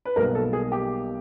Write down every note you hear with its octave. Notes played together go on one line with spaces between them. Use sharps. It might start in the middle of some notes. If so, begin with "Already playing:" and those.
B4
B1 B2 G3 A#3 A#4
A4
G#4
G4